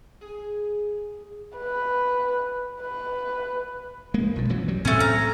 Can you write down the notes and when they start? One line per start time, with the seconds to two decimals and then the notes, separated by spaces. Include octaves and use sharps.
0.21 G#4
1.57 B4
2.81 B4
4.14 G#3 A#3
4.36 B1 A#2
4.50 F#2 E3 F#3
4.68 F#3 G3
4.85 A2 A3 C4 C#4
5.00 A#5